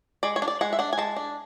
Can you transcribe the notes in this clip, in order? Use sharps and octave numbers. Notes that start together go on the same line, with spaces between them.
G#3 D5
C#5
D4
D5
G#3 F#5
E5
D4 F#5
G#5
G#3 A5
D4